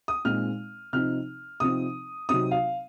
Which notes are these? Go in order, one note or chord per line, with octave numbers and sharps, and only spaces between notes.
D#6
A#2 G#3 C4 D#4 F6
C3 F3 C4 D#4 F6
C3 F3 C4 D#4 D#6
C3 F#3 C4 D#4 D#6
F5